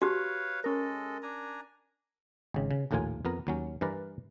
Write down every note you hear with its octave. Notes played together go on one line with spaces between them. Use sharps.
F#4 G4 B4 C#5 F5
G#3 C#4 A4 A#4 D#5
D4 G#5 A#5
G#1 C#3
C#3
A#1 D#2 A2 A#3 F4 G#5
F2 B3 A#4
D#2 F#3 C#4
G2 E3 A#4 B4 D5